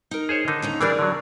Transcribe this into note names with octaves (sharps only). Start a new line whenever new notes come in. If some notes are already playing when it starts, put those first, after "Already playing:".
D#4 A#4
G#4 C5 C#5
D3 D#3 D#4
D#2 C#4 A#5
E3 G3 D4 G#4 A#4 D5
D3 F#3